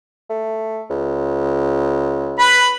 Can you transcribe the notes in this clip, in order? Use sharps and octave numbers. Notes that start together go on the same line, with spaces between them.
A3
C#2
B4 B5